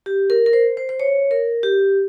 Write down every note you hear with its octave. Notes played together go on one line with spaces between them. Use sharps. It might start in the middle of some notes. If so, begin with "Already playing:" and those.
G4
A#4
A#4
C5
C5
C5
C#5
A#4
G4